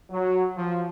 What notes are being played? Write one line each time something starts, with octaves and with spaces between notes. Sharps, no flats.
F#3
F3